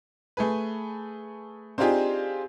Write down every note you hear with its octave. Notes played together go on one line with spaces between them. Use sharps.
A3 G#4 B4
C4 D4 D#4 F4 G4 G#4